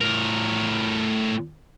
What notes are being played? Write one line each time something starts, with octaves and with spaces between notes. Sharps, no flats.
A2 A#4